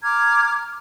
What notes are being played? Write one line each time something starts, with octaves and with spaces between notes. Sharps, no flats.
A#5 D6 F6 G#6